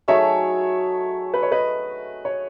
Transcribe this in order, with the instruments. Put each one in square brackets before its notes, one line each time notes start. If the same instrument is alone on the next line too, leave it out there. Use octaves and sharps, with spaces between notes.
[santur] F#3 A3 D#4 G#4 [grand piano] C#5 E5
[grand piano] B4
C#5
B4 D#5
C#5